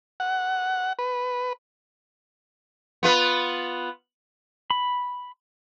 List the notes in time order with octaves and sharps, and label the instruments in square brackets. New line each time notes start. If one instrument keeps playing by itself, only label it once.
[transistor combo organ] F#5
B4
[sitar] B3 F4 B4
[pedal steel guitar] B5